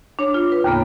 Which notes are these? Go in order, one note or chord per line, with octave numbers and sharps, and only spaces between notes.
D4 C#5 D6
F4
B4
D#2 A2 C#3 A#3 B3